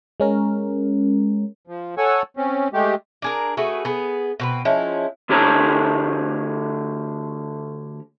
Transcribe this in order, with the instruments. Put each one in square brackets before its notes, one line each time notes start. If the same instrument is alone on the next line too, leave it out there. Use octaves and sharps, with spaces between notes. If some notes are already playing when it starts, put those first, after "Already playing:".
[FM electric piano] G#3 C#4 A#4
[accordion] F3
A4 C#5 F#5 G#5 C#6 E6
C4 C#4
G#3 A3 G4
[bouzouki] D4 G#4 A#4
A3 F#4 G#4 B4
B3 G#4
B2 C4 B4
F3 G#3 C#4 E4
[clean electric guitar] D2 D3 G4 A4 C#5 A#5